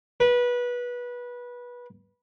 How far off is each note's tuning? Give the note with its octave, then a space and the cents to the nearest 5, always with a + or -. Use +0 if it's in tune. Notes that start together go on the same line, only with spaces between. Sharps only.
B4 -20